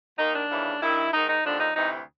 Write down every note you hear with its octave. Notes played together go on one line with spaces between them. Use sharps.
D#2 D#3 D#4
D4
D#2 C#3 E3
G2 D#3 E4
G#2 D#3 D#4
D#4
D#2 D3 F3 D4
D#4
D2 C3 E3 D#4